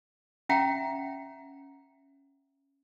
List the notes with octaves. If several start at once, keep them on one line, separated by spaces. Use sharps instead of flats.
C#4 E5 F#5 G5 A#5